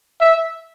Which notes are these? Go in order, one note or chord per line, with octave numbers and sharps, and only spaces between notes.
E5